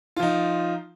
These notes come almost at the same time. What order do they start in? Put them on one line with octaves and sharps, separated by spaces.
F4 F3 D#4